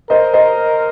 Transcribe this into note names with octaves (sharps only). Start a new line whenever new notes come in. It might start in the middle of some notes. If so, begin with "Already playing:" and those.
A#4 C5 D#5
C5 D#5